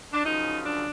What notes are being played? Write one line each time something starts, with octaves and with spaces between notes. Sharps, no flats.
D4
F#2 C#3 F3 D#4
D4